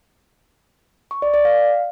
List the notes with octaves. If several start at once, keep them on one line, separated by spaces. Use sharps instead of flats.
C#6
D5
D5
F5